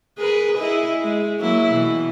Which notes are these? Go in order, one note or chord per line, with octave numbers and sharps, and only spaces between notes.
G#4 A#4 B4
E4 G#4 D#5
G#3
F#3 A#3 E4
B2 E3